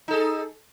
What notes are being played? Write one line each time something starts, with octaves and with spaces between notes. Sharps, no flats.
D#4 G#4 A4